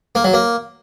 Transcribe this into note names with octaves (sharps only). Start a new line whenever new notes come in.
A#3
F#3
A#3